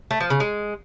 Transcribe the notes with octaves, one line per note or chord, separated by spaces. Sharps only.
A3
F3
C#3
G#3